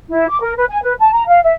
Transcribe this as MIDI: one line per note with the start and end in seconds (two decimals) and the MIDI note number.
0.11 0.27 64
0.29 0.40 86
0.42 0.54 70
0.57 0.65 71
0.70 0.78 80
0.83 0.94 71
1.00 1.10 81
1.13 1.24 82
1.28 1.40 77
1.44 1.53 76